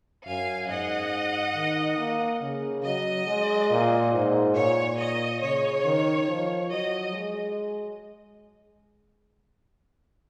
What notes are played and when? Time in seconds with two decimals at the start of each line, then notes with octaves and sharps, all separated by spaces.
0.26 F#2 F5 G#5
0.69 G#2 D#5 F#5
1.55 D#3
1.97 A#3
2.41 C#3
2.83 F#3 D#5
3.27 G#3
3.70 A#2
4.13 G#2
4.55 A#2 C#5
4.99 D#5
5.41 C#3 C#5
5.84 D#3
6.27 F3
6.70 F#3 D#5
7.13 G#3